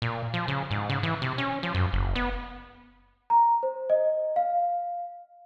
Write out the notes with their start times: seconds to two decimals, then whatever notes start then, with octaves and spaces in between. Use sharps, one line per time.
0.02 A#2
0.34 F3
0.48 C#3
0.71 G#2
0.89 C#3
1.03 E3
1.22 C3
1.38 C#4
1.63 F3
1.74 F#2
1.93 F#1
2.16 B3
3.30 A#5
3.63 C5
3.90 D#5
4.36 F5